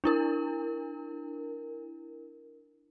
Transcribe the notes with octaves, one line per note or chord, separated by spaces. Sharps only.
D4 E4 A#4